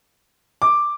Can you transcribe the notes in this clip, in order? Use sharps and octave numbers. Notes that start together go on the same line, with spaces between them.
D6